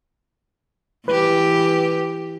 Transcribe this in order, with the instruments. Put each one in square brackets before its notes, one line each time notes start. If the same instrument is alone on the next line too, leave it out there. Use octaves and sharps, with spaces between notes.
[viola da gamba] E3 G4 [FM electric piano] B4